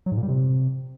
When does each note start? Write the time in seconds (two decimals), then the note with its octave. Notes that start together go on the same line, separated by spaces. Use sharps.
0.06 F#3
0.12 G#2
0.17 A#2
0.23 G3
0.29 C3